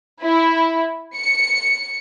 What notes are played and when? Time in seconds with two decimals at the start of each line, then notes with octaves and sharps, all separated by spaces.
0.23 E4
1.16 C#7